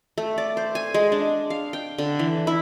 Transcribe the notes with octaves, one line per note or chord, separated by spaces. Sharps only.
A3
D5
C5
G#5
G#3
D4
F5
G5
D3
E3
E4